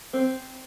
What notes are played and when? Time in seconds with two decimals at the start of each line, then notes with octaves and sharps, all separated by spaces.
0.13 C4